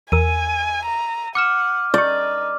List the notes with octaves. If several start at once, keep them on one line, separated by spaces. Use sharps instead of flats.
E2 A#4 G#5 E6 D#7
A#5
F#5 D6 F6 C#7 E7
D#4 D5 C#6 G6